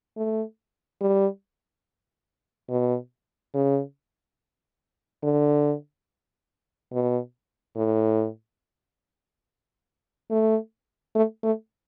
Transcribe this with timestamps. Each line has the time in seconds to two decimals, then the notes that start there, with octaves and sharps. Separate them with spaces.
0.17 A3
1.01 G3
2.70 B2
3.54 C#3
5.23 D3
6.93 B2
7.76 A2
10.31 A3
11.15 A3
11.44 A3